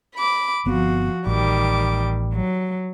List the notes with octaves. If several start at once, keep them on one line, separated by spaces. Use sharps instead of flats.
B5 D6
G1 F3 B3 C4 F#4
A1 D#3 G3 D6
F#3